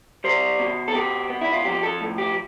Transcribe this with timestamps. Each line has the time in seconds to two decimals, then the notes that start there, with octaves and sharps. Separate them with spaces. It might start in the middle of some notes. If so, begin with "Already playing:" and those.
0.24 G3 C5
0.59 B2
0.88 A4
0.94 B2 G4
1.30 B3
1.41 E4
1.53 F4
1.65 F3 G4
1.83 A4
2.01 A2
2.18 G4